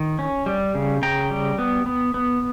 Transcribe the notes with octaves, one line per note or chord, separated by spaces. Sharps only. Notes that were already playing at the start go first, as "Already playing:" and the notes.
Already playing: D#3
C#4
G3
C#3
C#3 G5 A#5
G3
B3
B3
B3